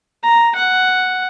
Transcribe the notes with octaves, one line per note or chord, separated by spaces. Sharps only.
A#5
F#5